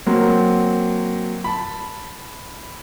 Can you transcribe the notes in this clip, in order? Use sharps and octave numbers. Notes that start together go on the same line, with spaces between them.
F#3 A#3 C4
A5 B5